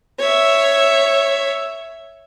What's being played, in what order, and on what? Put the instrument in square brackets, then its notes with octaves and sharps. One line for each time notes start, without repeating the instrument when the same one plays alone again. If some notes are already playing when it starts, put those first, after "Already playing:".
[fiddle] C#5 E5